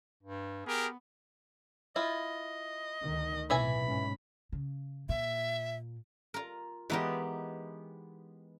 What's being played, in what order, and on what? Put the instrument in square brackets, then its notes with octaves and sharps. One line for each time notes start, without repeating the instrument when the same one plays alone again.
[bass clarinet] G2
[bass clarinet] B3 [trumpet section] G4 G#4 A#4
[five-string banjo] E4 F4 [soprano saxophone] D#5
[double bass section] D2 D#3
[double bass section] B1 A2 C3 [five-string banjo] E3 E5 G#5 [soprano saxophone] B5
[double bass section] G#2 C#4
[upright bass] C#3
[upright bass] A#2 [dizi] E5
[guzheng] F4 A#4
[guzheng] E3 D#4 A#4 [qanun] G#3 B3 G4